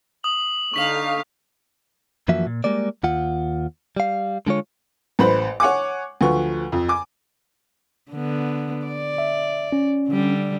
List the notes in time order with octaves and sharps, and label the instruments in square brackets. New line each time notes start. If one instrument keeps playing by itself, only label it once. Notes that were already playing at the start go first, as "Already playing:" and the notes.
[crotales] D#6 [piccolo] F#7
[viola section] D3 D#4 F5 [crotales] C#6 B6 F7
[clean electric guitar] F#2 E3 F3 A#3 F#4 E5
A#2
G3 G#3 A#3 D5
D#2 F4 F#5
G3 F5
D3 G#3 F4 C#5
[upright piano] A1 B4 C5 B5
C#5 F#5 G#5 D6
D2 F3 B4 C#6
F2
G#5 D6
[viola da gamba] D3 B3
D5
[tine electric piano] E5
C#4
[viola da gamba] D3 G3